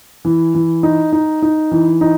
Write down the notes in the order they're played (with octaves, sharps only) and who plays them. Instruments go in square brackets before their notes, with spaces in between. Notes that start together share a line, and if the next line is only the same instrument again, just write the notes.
[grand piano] E3
E3
D#4
D#4
D#4
E3
D#4